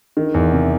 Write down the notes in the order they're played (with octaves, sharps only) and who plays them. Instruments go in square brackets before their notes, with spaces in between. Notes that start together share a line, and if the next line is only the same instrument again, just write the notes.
[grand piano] D#3
E2
C3